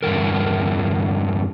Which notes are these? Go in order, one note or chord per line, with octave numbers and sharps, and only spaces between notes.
E2 G2 D3 D#3 A#4